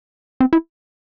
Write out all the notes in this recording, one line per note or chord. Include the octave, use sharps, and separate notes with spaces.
C4
E4